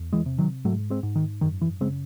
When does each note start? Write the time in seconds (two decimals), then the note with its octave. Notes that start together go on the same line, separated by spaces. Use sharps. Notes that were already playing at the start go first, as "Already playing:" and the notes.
Already playing: E2
0.13 E3 G#3
0.26 C3
0.38 D#3 F#3
0.65 G#2 F#3 A3
0.90 G#3 C4
1.03 G#2
1.16 D#3
1.41 F#2 D#3
1.61 E3
1.81 C#3 G#3 C4